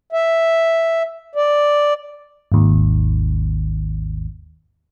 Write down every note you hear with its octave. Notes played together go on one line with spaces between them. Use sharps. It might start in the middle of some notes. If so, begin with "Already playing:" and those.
E5
D5
G#1 D#2